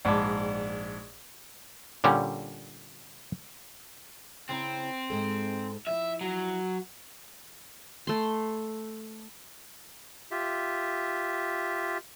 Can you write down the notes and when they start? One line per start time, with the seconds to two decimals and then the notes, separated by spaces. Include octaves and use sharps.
0.05 A#1 G#2 D5 A5 B5 D6
2.04 A#2 D3 G3 C#4
4.49 C#3 C4 E4 A#5
5.10 G#2 G#3 A4
5.87 F3 E4 E5
6.21 F#3
8.07 A3 C6
10.31 F4 G4 E5